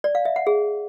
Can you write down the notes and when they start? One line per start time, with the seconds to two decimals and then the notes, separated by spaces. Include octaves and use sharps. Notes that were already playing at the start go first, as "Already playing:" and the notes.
0.04 D5
0.15 F5
0.25 E5
0.36 F#5
0.47 G#4